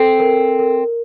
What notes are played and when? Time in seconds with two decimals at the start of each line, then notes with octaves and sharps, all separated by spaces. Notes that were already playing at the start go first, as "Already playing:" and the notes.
Already playing: C4 A4
0.20 A#4
0.59 A#4